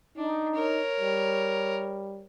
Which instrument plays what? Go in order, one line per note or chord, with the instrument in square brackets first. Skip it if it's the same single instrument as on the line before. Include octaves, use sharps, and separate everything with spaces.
[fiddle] D4 [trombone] D#4
[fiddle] A#4 C#5
[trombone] G3